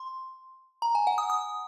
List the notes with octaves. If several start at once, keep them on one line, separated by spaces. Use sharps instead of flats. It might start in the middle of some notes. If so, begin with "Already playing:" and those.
Already playing: C6
A#5
G#5
F#5
D#6
D#6